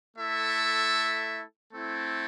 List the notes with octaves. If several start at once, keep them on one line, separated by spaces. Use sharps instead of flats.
A3 E4 A4 E5
A3 C4 E4 A4